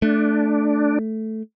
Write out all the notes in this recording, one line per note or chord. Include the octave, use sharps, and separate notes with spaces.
A3 D4